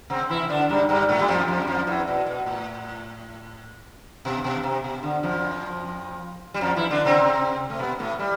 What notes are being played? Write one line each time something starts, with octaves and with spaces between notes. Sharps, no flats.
C3 C4
E3 E4
D3 D4
G2 G3
G2 G3
A2 A3
G3
F2 F3
F2 F3
G3
F2 F3
E2 E3
B2
B2
A2
B2
B2
C3
B2
D3
F2 F3
G3
F2 F3
E3 E4
D3 D4
C3 C4
A3
B2 B3
A2 A3
G3